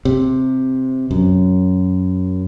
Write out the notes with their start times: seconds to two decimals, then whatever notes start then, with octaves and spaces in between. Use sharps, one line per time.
0.05 C3
1.11 F#2